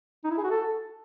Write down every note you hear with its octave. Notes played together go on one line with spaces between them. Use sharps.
D#4
E4
G#4
F#4
A4